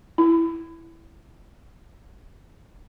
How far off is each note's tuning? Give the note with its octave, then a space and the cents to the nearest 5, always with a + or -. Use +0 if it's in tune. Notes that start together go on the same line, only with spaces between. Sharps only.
E4 +0 B5 +35